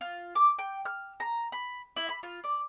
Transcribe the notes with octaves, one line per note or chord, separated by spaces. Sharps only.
F4
D6
G5
F6
A#5
B5
E4
B5
F4
D5